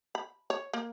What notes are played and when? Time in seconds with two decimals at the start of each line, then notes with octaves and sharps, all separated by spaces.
0.15 B5
0.50 C#5
0.73 A#3